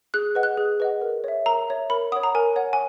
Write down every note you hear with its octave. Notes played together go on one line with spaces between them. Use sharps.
G#4 F#6
B4 D#5 F#5
F#6
G#4
B4 D#5 F#5
A#4
C#5 E5
A#4 A#5
C#5 E5
A#4 B5
C#5 F#5 D#6
A#5
A#4 G#5
C#5 F#5
G#5